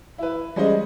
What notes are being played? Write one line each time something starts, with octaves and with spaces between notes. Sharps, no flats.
E4 B4
G3 G#3 C#4 G#4 C5 D#5